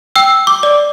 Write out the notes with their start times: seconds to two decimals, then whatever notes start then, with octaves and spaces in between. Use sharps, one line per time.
0.16 G5 E6
0.47 D6
0.63 D5